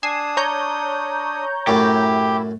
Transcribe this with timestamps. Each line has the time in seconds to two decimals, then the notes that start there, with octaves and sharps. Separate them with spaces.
0.03 D4 G#5 D#6 C7 E7
0.37 C#5 A#5 G6
1.67 F#2 A2 E4 G4